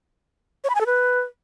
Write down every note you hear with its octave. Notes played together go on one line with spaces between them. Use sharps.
C#5
B5
G#5
A4
B4